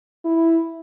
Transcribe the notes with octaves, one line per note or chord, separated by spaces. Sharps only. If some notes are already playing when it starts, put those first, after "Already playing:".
E4